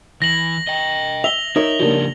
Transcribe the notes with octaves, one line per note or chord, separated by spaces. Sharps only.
E3 A#6 F#7
D#5 G5
E5 F7 G7
D#4 A#4 C#5 E5
C#3 F3 A#3 D4 G4